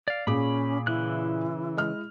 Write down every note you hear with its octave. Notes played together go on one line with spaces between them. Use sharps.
D5 F5
A#2 C#4 G#4 B5 D6
C#3 E3 E4 F#6
G#3 D#5 F6